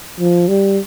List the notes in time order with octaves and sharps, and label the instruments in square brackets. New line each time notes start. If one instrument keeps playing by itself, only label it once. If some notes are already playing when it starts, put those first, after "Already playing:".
[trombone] F3
G3